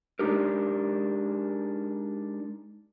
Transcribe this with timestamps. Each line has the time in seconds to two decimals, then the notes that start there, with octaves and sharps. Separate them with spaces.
0.19 G#3 D4 D#4 G4 A#4